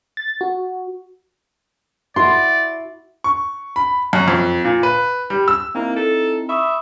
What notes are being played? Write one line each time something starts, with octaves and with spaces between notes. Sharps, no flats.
A6
F#4
E4 F#4 D5 C6
C#6
B5
F#2
F2
A#2
B4
G3
E6
A#3 C4 D#4 E4
A4
E5 B5 C#6 D#6